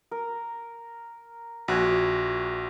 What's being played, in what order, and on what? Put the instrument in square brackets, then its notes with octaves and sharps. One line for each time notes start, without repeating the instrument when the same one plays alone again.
[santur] A#4
[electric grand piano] A#1 [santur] F#4 G#5